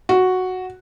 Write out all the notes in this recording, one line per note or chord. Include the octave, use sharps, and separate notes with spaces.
F#4